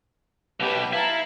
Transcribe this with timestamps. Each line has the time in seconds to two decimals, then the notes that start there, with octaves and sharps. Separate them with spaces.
0.60 B1 B2 G4 B4
0.93 E4 F5 A5 A#5